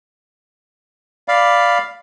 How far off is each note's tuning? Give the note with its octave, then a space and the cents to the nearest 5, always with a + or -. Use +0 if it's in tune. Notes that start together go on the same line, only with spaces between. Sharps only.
D5 +0 F5 +0 B5 +0